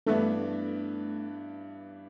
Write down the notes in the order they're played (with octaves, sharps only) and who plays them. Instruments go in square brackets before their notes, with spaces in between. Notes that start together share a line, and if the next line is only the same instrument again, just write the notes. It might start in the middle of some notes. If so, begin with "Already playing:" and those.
[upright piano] G2 E3 B3 D4 [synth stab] A3